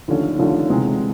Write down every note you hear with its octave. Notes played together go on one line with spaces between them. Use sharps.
D#2 D3 F3 A3 C#4
D#2 D3 F3 A3 C#4
C3 E3 G#3 B3